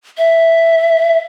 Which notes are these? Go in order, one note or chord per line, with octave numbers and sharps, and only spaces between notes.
E5